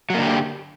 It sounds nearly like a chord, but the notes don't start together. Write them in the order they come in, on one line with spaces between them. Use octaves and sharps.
F#3 A#3 D3 G4